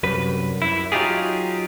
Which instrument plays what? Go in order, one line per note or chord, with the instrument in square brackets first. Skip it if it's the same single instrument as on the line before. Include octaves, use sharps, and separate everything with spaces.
[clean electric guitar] C2 F#2 B4
F#2 E4
F#3 D#4 F4 G4 G#4